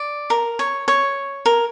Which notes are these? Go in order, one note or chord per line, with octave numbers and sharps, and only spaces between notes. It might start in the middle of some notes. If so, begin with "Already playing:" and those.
Already playing: D5
A#4
C#5
C#5
A#4